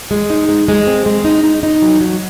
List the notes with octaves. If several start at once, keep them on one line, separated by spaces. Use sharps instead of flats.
G#3
D#4
G#3
G#3
C4
G#3
D#4
D#4
D#4
F#3
F#3